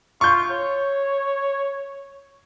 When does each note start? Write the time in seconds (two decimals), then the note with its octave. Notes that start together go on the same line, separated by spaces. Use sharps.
0.21 F4 C#6 G6
0.51 C#5